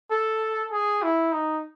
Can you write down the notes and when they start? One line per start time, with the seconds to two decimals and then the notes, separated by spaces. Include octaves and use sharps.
0.11 A4
0.72 G#4
1.02 E4
1.33 D#4